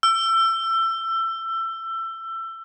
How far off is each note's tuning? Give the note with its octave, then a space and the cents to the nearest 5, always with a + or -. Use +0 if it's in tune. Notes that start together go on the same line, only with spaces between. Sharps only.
E6 +25